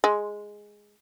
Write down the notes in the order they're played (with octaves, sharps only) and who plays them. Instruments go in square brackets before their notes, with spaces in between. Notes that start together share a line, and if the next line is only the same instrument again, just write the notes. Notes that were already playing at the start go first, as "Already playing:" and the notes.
[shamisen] G#3